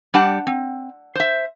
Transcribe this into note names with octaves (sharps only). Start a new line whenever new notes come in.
G3 D4 G4 F#5 A5
C4
C5 E5